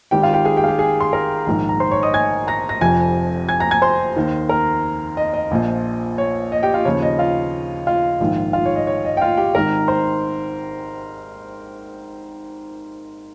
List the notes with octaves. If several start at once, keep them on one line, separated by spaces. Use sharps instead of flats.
G#1 G#2 D#3 G4 G5
F4 F5
G4 G5
G#4 G#5
G4 G5
F5
G4 G5
G#4 G#5
C6
A#4 A#5
A#1 G#2 D#3
A#5
C5 C6
C#5 C#6
D#5 D#6
G#5 G#6
A#5 A#6
A#6
F1 F2 C3 F3 G#5 G#6
G#5 G#6
A#5 A#6
G#5 G#6
C5 C6
D#2 D#3
A#4 A#5
D#5
D#5
A#1 A#2 F3
C#5
D#5
G4 G5
F4 F5
D#2 C#3 F3 C#5
D#5
F4 F5
F4 F5
A#1 G#2 D#3
F4 F5
C#5
D#5
C#5
D#5
G5
F4 F5
G4 G5
G#1 G#2 D#3 A#4 A#5
C5 C6